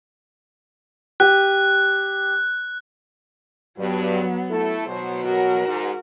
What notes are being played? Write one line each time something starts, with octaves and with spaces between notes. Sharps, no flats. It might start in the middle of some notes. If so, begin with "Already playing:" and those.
G4 F#6
G2 F#3 B3
A3 E4 A4
B2 F#3 C5
F#4 A#4
G#2